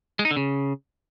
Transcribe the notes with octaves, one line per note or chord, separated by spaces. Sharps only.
G#3
D#4
D3
C#3